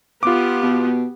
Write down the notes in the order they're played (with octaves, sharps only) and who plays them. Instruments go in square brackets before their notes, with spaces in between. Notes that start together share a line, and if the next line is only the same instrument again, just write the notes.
[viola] B3 G4 [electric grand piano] F4 D6
[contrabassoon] B2